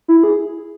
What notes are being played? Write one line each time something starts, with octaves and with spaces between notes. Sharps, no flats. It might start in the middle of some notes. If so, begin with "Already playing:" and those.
E4
G#4